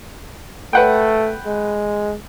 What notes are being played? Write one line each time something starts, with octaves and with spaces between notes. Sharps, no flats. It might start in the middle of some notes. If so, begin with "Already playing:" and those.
A3 B4 F#5 G5
G#3